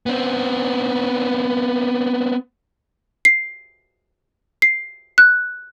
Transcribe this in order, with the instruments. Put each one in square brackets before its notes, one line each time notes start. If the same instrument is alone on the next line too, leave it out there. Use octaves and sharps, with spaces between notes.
[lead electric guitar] B3 C4
[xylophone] C7
C7
F#6